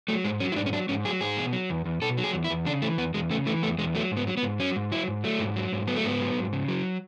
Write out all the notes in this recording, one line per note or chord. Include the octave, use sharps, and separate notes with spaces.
F#3 A3
G#2 G#3
F#3 C#4
E4
G#2 D4
C#4
F#3 D4
G#2 C#4
F#3 G#4
G#2 G#4
B2
F#3
E2
E2
B2 A4
F#3
G#4
E2
E4
E2
C#3 D4
E3 A3
E2 B3
E2 G#3
C#3 A3
E3 A3
E2 A3
E2 G#3
F#3 A3
G#2
B3
F#3
B3
G#2
F#3 C#4
G#2
F#3 E4
G#2
F#3 A3
G#2
F#3
G#2
F#3 B3
A3
G#2 B3
F#3
G#2
C#3
F#3